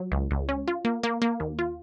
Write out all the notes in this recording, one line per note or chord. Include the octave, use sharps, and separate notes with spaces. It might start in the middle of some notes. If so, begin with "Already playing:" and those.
Already playing: F#3
C#2
C#2
C#4
F4
A#3
A#3
A#3
D#2
F4